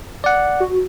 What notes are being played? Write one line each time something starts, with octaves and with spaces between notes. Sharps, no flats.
D5 F#5
F#4